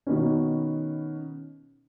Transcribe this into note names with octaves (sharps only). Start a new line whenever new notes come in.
B2 D#3 B3 C#4